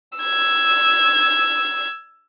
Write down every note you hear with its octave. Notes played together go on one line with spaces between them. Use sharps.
E6 G#6